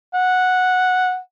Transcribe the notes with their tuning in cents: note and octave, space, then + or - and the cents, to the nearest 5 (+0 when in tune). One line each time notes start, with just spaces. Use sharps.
F#5 -10